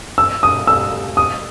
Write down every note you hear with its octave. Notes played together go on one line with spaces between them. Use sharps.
E6
D#6
E6
D#6